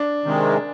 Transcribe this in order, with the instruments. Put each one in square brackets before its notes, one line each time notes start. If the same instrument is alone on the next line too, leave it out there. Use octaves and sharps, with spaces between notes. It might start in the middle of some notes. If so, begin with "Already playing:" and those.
Already playing: [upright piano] D4
[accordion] C3 D#3 G#3